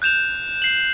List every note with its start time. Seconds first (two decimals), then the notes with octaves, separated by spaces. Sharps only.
0.02 F#6 G6 E7 F7
0.62 C7 F#7